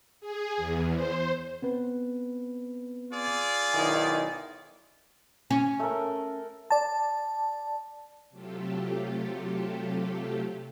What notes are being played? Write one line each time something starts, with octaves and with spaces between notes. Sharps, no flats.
G#4
E2
C5
B3 C4 B4
F4 G#4 D5
B1 D#3 E4 G#5
C#4
A3 A#4
D5 A5
C3 F#3 A3 F4 G4 A4